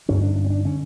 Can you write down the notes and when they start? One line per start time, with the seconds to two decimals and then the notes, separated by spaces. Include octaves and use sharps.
0.08 G2 D3 C#4
0.22 D4
0.36 D4
0.44 C#4
0.50 D4
0.65 D3 C#4